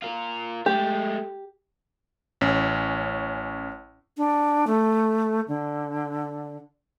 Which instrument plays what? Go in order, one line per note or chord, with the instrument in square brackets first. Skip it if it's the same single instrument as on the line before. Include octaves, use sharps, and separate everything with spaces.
[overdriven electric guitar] F4 A#4
[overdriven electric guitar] G#3 A3 [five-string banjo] G4
[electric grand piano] A1 C#4
[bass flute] D4
A3
D3